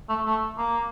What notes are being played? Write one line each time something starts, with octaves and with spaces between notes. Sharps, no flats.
A3
A3
A#3